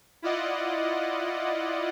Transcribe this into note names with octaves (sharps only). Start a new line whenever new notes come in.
E4 F4 D5 D#5 F#5